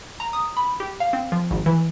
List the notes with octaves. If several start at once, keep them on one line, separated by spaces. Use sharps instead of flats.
A#5
D#6
B5
G4
F5
C4
F3
G#1
E3